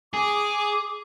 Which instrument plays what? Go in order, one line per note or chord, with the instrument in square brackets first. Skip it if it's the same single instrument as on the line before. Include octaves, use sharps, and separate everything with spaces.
[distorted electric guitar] G#4 [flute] D6